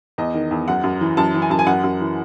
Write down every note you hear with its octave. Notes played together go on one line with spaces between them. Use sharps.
E2 D#5
D#3
E2
F#2 F#5
F#2
E3
F#2 A5
E3
G#5
F#2 A5
G#5
F#2 F#5
F#2
E3